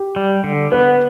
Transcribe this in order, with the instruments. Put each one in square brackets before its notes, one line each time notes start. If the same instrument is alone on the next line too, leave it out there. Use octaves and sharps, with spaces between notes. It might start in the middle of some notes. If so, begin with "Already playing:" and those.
Already playing: [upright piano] G4
[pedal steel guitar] G3
D3
[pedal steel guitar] B3 [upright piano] B4